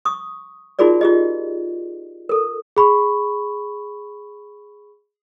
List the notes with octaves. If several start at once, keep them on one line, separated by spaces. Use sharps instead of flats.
C#6 D#6
D#4 F4 F#4 G#4 A#4 D5
F4 G4 D#5
A4 A#4
G#4 B5 C#6